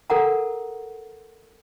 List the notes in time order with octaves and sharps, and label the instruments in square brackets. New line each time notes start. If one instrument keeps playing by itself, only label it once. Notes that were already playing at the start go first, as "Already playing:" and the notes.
[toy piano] A4 A#4 F#5 A#5